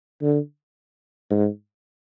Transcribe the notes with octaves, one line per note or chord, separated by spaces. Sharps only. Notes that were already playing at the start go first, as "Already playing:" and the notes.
D3
G#2